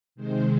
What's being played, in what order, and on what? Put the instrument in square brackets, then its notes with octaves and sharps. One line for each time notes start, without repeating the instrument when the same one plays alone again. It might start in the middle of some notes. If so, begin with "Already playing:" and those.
[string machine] C3 D#3 G#3 C5